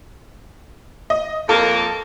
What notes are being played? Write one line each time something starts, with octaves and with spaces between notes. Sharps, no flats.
D#5
F2 A#3 A4